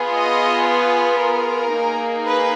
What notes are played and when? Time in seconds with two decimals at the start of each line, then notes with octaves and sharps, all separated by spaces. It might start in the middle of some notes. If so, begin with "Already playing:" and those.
Already playing: B3 F4 G#4
0.14 D#5
0.66 B4
1.20 A#4
1.72 A#3 D#4 G#4
2.25 B4